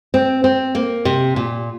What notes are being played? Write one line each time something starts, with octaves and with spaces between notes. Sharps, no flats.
C4
C4
A#3
C3
A#2